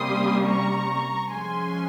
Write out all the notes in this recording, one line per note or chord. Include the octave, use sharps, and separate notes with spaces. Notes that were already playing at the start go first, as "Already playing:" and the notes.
Already playing: C3 G3 A#3 C#4 C6 D#6
A#5 C#6
F3 G#3 C#4 G#5 C6